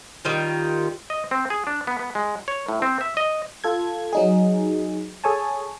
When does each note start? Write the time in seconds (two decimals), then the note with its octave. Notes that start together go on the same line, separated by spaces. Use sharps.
0.25 D#3 G3 F4
1.10 D#5
1.31 C4
1.50 G#4
1.67 D4
1.87 B3
1.99 B3
2.15 G#3
2.48 C#5
2.68 A2
2.82 C4
3.01 E5
3.17 D#5
3.64 F4 A4 G#6
4.13 F#3 D#4 G#4
5.24 G#4 A4 C#5 G#5 A5